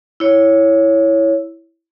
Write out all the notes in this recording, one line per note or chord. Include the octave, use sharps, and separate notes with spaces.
E4 C#5